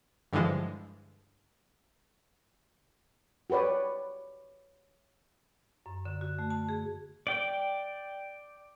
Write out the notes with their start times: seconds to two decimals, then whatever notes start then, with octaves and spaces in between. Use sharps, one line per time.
0.33 G2 D3 E3 F3 G#3
3.50 F#4 G4 B4 C#5 D5
5.86 F#2
6.06 D3
6.21 F#4
6.39 A3
6.50 A5
6.69 G#4
7.27 D5 G5